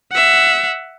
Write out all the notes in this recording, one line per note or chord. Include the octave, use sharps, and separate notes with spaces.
E5 F#5